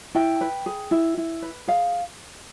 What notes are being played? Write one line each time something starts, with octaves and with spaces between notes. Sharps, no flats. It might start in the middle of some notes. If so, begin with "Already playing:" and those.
E4 G5
B4
G#4
E4
E4
B4
G#4 F5